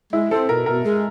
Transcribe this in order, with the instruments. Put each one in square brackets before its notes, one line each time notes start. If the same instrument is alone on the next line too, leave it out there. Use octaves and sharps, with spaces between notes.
[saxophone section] G#3 [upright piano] E4
[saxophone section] C4 [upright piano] A4
[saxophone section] B2 [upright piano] A#4
[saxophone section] B2 [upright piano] A#4
[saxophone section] G#3